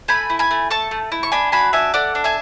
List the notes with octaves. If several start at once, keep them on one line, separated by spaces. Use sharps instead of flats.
A3 G#5 B5
E4
G#5 B5
A3
A4 A5 C#6
A3
E4
C#6
D4 G#5 B5
F#4 G#5 B5
D4 E5 G#5
A4 D5 F#5
D4
E5 G#5